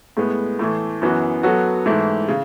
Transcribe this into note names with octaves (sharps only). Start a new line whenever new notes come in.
A2 G#3 B3
A2 E3 A3
F#2 E3 B3 F#4
F#3 B3 F#4 A4
G#2 E3 A3 E4
C#3